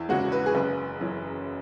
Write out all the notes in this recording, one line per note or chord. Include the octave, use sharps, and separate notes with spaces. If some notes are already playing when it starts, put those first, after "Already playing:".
Already playing: E2 E4
C#3 E3 G#3 F#4
B4
G#4
F#1 B4
F#2 E3